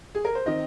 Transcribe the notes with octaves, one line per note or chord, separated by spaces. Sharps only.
G#4
A#4
C5
D#3 C4 D#5